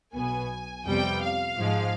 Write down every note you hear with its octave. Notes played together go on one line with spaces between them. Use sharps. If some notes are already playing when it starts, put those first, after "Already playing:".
B1 B2 B3 G#5
F2 C3 G3 B3 G5
F5
G#2 F3 G#3